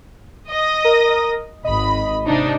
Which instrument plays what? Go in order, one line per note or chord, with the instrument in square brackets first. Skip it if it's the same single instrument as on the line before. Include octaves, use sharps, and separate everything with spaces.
[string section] D#5 D#6 A#6
[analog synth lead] A#4
[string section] G#1 B5 [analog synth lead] D#5
[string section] C3 D4 D#4